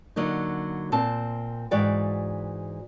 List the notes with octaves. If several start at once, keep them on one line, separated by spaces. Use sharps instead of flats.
D3 F#3 A#3 D#4
A#2 C4 A5
G#2 E3 F#4 D5 F5 G5